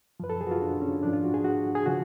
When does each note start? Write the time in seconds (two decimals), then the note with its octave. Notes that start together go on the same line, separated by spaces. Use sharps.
0.20 F#2 F3 B4
0.30 A4
0.41 G#4
0.47 F#4
0.51 F4
0.62 D4
0.82 C#4
1.03 G#2 F3 D4
1.13 F4
1.24 F#4
1.34 G#4
1.44 F#4
1.75 G#4
1.86 C#3 F3 F#4